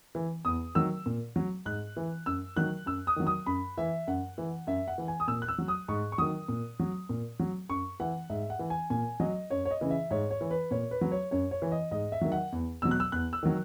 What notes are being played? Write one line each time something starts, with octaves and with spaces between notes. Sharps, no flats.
E3
E2 D#6
D#3 F#3 E6
A#2
F#3
G#2 F#6
E3
F#2 E6
D#3 F#3 F#6
F#2 E6
D#6
D#3 F#3
D#6
F#2 B5
E3 E5
F#2 F#5
E3
F#2 E5
F#5
E3
G#5
D#6
A#2 E6
F#6
E6
F#3
D#6
G#2 C#6
C#6
D#3 F#3 D#6
A#2
F#3
A#2
F#3
F#2 C#6
E3 F#5
G#2 E5
F#5
E3
G#5
A#2 G#5
F#3 D#5
F#2 C#5
C#5
D#5
C#3 E3
E5
G#2 C#5
C#5
E3
B4
A#2 C#5
B4
F#3
C#5
F#2 C#5
C#5
E3
D#5
G#2 D#5
E5
D#3 F#3
F#5
E2
B2 F#3 E6
F#6
E6
E2 F#6
E6
D#3 F#3